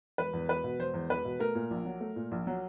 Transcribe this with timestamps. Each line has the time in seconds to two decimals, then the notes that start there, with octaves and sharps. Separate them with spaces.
0.18 E1 B4
0.33 E2
0.48 E1 B4
0.64 B2
0.79 E1 C5
0.94 E2
1.10 E1 B4
1.25 B2
1.39 A3 A#4
1.55 A#2
1.71 A#1
1.85 F#3
2.01 A3
2.16 A#2
2.31 A#1
2.47 F#3